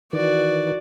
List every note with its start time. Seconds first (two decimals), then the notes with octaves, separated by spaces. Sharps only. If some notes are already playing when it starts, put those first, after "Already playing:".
0.13 D#3 E3 F#4 D5